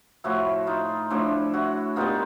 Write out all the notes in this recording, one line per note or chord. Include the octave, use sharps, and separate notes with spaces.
A2 F3 A3 E4 F#4
D#4 F4
A2 F3 A3 D4 E4
E4 F#4
A#2 G3 B3 D#4 F4